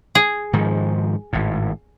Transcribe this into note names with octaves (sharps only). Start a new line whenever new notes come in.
G#4
G#2 D#3 F3
G#1 A2